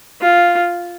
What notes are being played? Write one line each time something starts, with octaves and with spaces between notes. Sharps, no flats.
F4